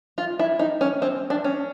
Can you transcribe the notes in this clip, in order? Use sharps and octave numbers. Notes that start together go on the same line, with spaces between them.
F4
E4
D#4
C#4
C4
D4
C#4